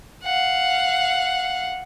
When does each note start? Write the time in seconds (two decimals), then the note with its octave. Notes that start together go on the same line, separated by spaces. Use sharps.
0.23 F5 F#5